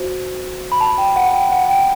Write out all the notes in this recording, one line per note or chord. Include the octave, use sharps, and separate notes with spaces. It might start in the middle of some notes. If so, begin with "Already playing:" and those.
Already playing: F#4 C5
B5
A5
G5
F#5
G5
F#5
G5